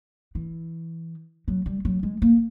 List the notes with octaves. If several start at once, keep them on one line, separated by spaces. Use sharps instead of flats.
E3
F#3
G3
F#3
G#3
A#3